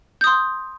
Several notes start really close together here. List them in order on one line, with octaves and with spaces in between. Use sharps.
G6 D#6 C6